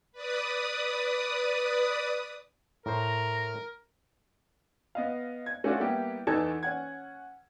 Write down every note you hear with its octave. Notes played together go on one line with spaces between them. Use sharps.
B4 D5 D#6
A2 A#4 C5 A#5
B3 D#5 F5
G#6
A3 C#4 D4 F4 F#4
G3 A#3 B3 E4 G4
E2 E3 D#4 A4 A5 G#6
C#4 F#5 G#6